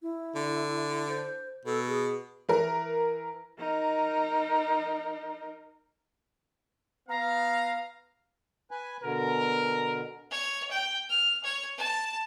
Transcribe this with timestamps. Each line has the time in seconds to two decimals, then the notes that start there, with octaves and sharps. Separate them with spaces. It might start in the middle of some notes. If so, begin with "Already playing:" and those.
0.02 E4
0.35 D3
1.09 C5
1.66 B2 A4
1.88 G#4
2.49 E3 A#4
3.59 D#4 A#4
7.09 B3 F5 A#5
8.71 B4 G#5
9.03 B2 D3 A#4
10.31 C#5
10.71 G5
11.10 F6
11.44 C#5
11.77 A5